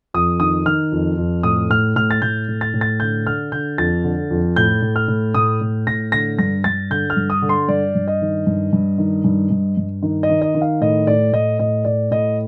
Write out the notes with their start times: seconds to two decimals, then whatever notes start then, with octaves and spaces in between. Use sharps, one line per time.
0.14 F2 D#6
0.40 D#3 D#6
0.65 D#3 F6
0.92 F2
1.17 F2
1.43 A2 D#6
1.70 A2 F6
1.96 A2 F6
2.11 A6
2.22 A2 G6
2.49 A2
2.61 A6
2.74 A2
2.81 A6
3.00 D3 G6
3.26 D3 F6
3.52 D3 G6
3.78 F2 A6
4.04 D3
4.31 F2
4.56 A2 G6
4.82 A2
4.96 F6
5.08 A2
5.34 A2 D#6
5.61 A2
5.87 A2 A#6
6.12 D3 A#6
6.39 G2 A#6
6.64 G2 A6
6.90 D3 G6
7.10 F6
7.16 G2
7.30 D#6
7.42 D3
7.49 C6
7.68 G2 D5
7.95 G2
8.07 D#5
8.21 D#3
8.47 G2
8.73 G2
8.98 D#3
9.24 G2
9.51 G2
9.77 G2
10.03 D#3
10.23 D#5
10.30 D#3
10.42 D#5
10.55 D#3
10.61 F5
10.81 A2 D#5
11.07 A2 D5
11.33 A2 D#5
11.59 A2 D#5
11.85 A2 D5
12.11 A2 D#5